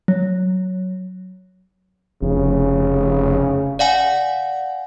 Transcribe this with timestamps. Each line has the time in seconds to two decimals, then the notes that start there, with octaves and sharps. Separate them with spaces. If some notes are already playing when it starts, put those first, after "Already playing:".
0.08 F#3
2.22 F1 C#3
3.79 D5 F5 F#5 G#5